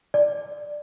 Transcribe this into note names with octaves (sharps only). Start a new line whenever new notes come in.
D5